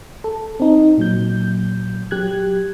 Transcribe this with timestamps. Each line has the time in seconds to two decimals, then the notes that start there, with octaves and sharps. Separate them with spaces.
0.24 A4
0.60 C4 D#4
0.98 A#2 F#3 G6
2.11 F#3 G4 F#6 G#6